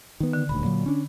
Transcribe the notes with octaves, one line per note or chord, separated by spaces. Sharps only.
D#3 B3
D3
D#1 D2 B5
A#2 F#3
C#4 D4